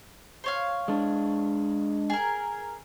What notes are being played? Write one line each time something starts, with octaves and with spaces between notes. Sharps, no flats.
C5 C#5 F5
G#3 D4
G#4 A#4